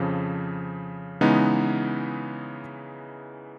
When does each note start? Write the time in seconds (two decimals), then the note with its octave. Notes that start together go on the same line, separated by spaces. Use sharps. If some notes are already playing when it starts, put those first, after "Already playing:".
Already playing: F2 C#3 F3
1.21 C#3 E3 G#3 B3 D#4